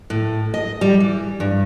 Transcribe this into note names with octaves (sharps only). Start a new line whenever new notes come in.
A2
D#5
G3
E3
G2